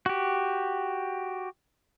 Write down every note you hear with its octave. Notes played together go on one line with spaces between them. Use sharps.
F#4 G4